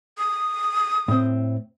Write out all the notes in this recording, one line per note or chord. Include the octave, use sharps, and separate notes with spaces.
D#6
A2 C4